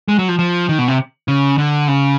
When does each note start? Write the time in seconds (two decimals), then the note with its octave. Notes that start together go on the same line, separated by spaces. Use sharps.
0.08 G#3
0.19 F#3
0.28 F3
0.39 F3
0.69 D#3
0.78 B2
0.88 C3
1.28 C#3
1.58 D3
1.88 C#3